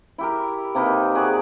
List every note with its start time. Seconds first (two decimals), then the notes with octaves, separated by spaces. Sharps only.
0.18 E4 G4 A#4
0.75 C3 A#3 D#4 B4
1.14 F#4 G#4 D5